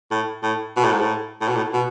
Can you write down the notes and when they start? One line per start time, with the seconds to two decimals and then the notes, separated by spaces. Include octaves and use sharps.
0.11 A2
0.43 A2
0.77 B2
0.84 A2
0.92 G#2
1.01 A2
1.41 A2
1.48 B2
1.56 A2
1.73 B2